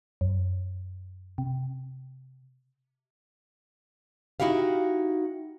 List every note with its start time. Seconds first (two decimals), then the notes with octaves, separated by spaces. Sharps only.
0.21 F#2
1.38 C3
4.40 D#4 E4 F#4 G4 F5